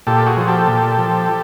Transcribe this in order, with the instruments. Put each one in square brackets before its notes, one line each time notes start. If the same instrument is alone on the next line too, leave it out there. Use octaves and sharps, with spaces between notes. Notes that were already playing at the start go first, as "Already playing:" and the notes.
[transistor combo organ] A#2 G4 A4
F#4 G#4
F3
G4 A4
A#2
F3